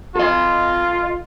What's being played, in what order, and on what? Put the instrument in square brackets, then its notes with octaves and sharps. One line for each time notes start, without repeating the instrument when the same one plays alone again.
[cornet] F4 [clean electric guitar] A4 D#5